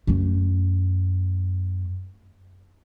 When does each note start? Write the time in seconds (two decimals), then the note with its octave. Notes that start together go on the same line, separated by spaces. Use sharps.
0.07 F#2 A3